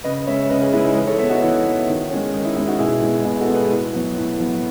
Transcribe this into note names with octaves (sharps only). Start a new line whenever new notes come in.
C#3 B4 D#5
G#3 C#4 C#5 E5
C#3 B4 D#5
G#4 B4
G#3 C#4 E4
D#4
E3 G#4 B4
A4 C#5
B3 C#5 E5
D#4 F#4
E3 E4
B3
D#3
G#3 C#4
D#3 D#4
E4
G#3 C#4 E4
D#4 F#4
B2 E4 G#4
G#3 B3
B2 E4 G#4
F#4 A4
G#3 B3
G#4 B4
A2
F#3 B3
A2
F#3 B3